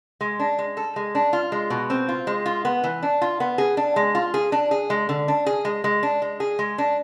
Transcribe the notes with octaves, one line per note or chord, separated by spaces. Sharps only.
G#3
D4
G#3
A4
G#3
D4
F4
G#3
B2
C4
F4
G#3
F4
B3
E3
D4
F4
B3
G#4
D4
G#3
F4
G#4
D4
G#4
G#3
D3
D4
G#4
G#3
G#3
D4
G#3
G#4
G#3
D4